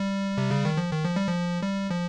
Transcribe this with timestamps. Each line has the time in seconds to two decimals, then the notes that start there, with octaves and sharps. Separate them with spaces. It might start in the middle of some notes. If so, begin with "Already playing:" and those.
Already playing: G3
0.38 C3
0.51 C#3
0.65 D#3
0.77 F3
0.91 D#3
1.05 F3
1.16 G3
1.28 F3
1.63 G3
1.90 F3